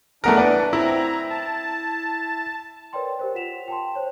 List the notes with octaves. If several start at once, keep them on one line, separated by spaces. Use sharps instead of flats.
E3 A3 B3 D4 A#4
B4 D5 F#5
C4 E4 A#5
A5
A#4 B4 C#5 D5 G5 C6
G4 A#4 C5
F4 F#5 B6 E7 F7
G5 A5 C6
C5 C#5